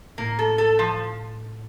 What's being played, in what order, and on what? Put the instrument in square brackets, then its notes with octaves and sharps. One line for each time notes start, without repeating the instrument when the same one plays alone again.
[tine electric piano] A2 [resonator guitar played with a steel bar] A#3
[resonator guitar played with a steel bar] A4
A4
F3